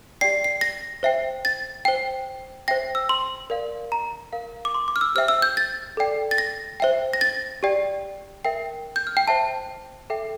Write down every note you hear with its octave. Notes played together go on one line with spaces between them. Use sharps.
G4 D5 G5 C7
C7
A#6
C5 E5 G5
A6
C5 G5
C5 E5 G5 A#6
E6
C6
A#4 D5 F5
A#5
A#4 F5
D6
C6
D6
F6
E6
G4 C5 E5 G5 F6
E6
G6
A6
A4 D5 G5
A6
A#6
C5 E5 G5
A#6
A6
G4 D5 G5
A#4 E5 G5
G6
F6
G5
C5 E5 G5 A5
A4 E5 G5